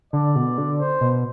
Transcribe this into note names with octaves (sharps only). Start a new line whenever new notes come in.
D3 D5
B2
D3
C5
B2